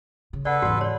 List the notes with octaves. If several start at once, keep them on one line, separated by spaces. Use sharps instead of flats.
C#3
A4 B4 D5 F#5
E2 G#2 F#4
C#5 D5